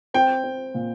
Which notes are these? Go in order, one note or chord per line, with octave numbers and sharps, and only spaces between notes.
C4 G5
C4
A#2